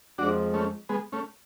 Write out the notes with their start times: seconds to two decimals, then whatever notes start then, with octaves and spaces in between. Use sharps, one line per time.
0.18 F2 F3 G#3 D4 F#4
0.54 A3 C#4
0.89 G#3 B3
1.12 A3 C#4